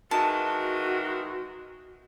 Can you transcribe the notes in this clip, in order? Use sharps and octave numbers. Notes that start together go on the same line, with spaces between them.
D#3 E3 G#3 F#4 A5